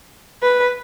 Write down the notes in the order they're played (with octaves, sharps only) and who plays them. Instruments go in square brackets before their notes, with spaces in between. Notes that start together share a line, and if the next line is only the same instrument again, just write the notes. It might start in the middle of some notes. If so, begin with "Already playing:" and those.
[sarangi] B4